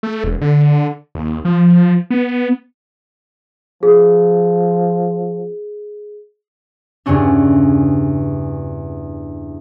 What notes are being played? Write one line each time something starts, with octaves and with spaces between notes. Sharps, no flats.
A3
E1
D3
D#2
F3
B3
F3 G#4
E2 G2 C#3 C#4 D4